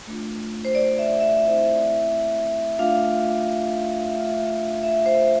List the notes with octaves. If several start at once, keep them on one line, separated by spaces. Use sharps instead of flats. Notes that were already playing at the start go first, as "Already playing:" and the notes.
A3 D4 F4
C5
D5
E5
E5
A3 C4 E4
A3 D4 F4 F5
E5
A3 D4 F4 F5
E5
C5